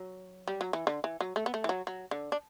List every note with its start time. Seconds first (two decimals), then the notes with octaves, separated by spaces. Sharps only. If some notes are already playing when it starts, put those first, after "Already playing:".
Already playing: F#3
0.48 G3
0.61 F#3
0.73 E3
0.87 D3
1.04 E3
1.21 F#3
1.36 A3
1.46 B3
1.54 A3
1.64 E3
1.69 F#3
1.87 F#3
2.11 D3
2.32 D4